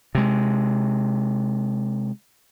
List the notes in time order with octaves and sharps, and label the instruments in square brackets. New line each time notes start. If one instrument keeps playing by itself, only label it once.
[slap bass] C3 G#3